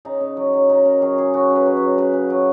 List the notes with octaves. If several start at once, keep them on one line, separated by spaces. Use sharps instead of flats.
C#3 D#4
C#3
F#3
F#3
C#3 D#4
C#3 A#4
F#3 G#4
F#3 G#4
C#3 F#4
C#3
B4
F#3
B4
F#3
C#3 B4
C#3
F#3